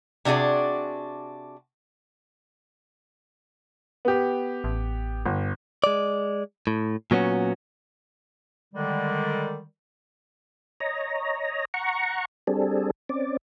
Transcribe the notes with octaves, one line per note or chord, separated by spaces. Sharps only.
C3 D4 F#4 G#4 D5
B3 G4
A1
G1
G#3 D5
A2
A#2 F#3 B3 C#4 F#4
D3 D#3 G3 G#3
C#5 D#5 A#5
F#5 A#5 C#6
G3 C4 D4 G#4 A4
C4 C#4 D5